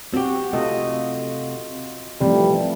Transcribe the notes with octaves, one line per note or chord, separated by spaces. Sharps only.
C4 F#4 G4
C3 A3 F4 D#5
C3 E3 F3 G3 A3